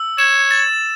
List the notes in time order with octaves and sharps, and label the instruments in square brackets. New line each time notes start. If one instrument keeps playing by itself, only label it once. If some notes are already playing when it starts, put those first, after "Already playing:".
Already playing: [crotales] E6
[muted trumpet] C#5 [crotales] E7
[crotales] A6